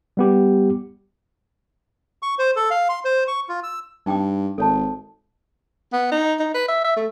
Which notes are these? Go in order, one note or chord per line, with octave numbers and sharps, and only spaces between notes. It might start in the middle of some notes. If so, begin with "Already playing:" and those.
G3 B3 G4
C#6
C5
A4
F5
C6
C5
C#6
F4
E6
G2 D#4 G5 D6
G#1 A4 C#5 A5
B3
D#4
D#4
B4
E5
E5
A3